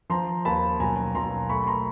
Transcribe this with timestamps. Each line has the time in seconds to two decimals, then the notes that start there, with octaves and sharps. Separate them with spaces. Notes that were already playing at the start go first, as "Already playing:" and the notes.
0.10 F3 A#5 C6
0.45 D#2 A5 B5
0.80 B1 G#5 A#5
1.14 B1 A#5 C6
1.49 A3 B5 C#6
1.67 A#5 C6